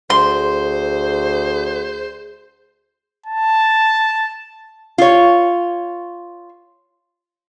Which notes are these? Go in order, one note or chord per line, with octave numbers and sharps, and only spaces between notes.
D2 G#4 C5 C6
A5
F4 C#5